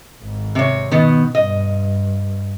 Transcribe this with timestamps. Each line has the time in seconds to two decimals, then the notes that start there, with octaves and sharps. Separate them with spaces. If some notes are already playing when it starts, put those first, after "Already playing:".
0.23 G#1
0.55 C3 C#5
0.91 B2 D#3 B3
1.35 G2 D#5